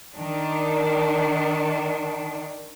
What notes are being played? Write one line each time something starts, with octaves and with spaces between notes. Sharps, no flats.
D#3 D4